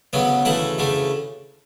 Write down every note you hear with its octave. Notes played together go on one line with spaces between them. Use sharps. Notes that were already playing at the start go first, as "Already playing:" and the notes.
D2 C#3 F#3 B3
D2 C#3 E3 A3 F#5
D2 C#3 E3 A3